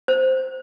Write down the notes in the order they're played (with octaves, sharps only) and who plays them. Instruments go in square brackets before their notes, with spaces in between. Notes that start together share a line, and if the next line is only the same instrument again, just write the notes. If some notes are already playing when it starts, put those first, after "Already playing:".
[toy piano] C5